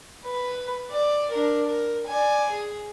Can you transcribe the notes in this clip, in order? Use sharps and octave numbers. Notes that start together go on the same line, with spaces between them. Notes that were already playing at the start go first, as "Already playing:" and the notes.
B4
D5
D4 A#4
A#4
D5 G#5
G#4